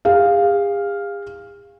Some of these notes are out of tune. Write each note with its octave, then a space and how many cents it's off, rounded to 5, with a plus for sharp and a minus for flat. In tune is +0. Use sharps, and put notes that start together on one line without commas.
G#4 -45 F5 +0